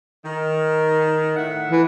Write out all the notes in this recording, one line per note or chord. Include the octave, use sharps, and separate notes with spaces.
D#3
A2 E5 F#5
E3